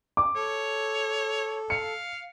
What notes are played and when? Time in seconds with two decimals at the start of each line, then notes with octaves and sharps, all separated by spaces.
0.17 D6
0.35 A4 C#5
1.70 F5 C#7